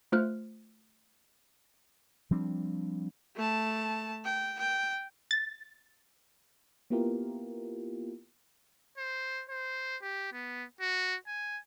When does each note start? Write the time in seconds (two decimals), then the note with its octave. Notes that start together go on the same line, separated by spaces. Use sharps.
0.12 A3 F4 C5 F6 F#6
2.31 F3 G3 C4 D4
3.36 A3 A5
4.25 G5
4.59 G5
5.31 A6
6.90 A#3 B3 E4 F4 G4 A#4
8.98 C5
9.50 C5
10.02 G4
10.33 B3
10.81 F#4
11.27 G#5